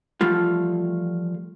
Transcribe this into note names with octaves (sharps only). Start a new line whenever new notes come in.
E3 F3 G3 A3 F4